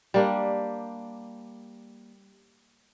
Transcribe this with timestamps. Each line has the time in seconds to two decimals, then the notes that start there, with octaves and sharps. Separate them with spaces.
0.14 G3 A#3 D4